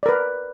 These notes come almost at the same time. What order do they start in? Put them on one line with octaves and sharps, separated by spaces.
D5 A#4 B4